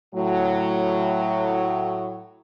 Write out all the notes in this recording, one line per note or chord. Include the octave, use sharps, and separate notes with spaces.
A2 F#3